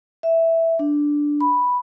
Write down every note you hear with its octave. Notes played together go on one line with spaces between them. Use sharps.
E5
D4
B5